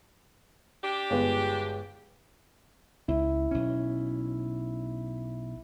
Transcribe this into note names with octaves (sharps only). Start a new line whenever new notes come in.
D4 G4
G1 G#3 B4
C#2 E4
B1 C#4